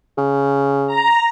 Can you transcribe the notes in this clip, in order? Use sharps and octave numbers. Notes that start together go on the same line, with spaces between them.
C#3
A#5